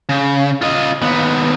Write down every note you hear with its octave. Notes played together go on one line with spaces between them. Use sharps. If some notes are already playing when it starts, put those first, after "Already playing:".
C#3
F4 D#5
D#2 B3